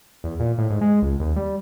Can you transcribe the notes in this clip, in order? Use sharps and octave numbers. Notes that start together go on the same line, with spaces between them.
E2
A#2
A2
G#2
G#3
C#2
D#2
G3